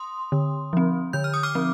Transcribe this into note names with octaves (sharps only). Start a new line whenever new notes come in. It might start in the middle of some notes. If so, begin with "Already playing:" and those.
Already playing: C6 D#6
D3
F3 C4
D3 G6
F6
D#6
D6 F6
F3 C4